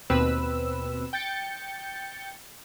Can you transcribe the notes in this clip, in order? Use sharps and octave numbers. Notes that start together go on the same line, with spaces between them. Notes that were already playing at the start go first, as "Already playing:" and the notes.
D#2 B2 C4 B4 E6
G5 G6 A6 C#7